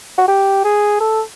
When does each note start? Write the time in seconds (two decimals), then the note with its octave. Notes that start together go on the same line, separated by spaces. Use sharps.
0.18 F#4
0.28 G4
0.65 G#4
1.01 A4